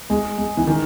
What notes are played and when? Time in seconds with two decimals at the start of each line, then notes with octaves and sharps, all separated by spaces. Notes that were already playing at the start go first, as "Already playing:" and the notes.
0.10 G#3
0.38 G#3
0.57 E3
0.67 D#3